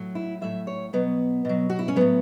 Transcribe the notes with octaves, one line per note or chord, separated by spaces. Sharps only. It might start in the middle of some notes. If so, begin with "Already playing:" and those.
Already playing: A2 F#3
E4
A2 F#3 E5
C#5
B2 F#3 B3
B2 F#3
F#4
E4
C#4
A2 F#3 B3